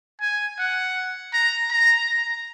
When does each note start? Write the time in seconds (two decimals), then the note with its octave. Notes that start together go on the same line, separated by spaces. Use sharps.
0.21 G#5
0.59 F#5
1.34 A#5
1.71 A#5